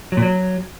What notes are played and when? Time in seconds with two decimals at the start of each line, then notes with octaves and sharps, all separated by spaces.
0.12 F#3
0.17 A#2
0.22 F#3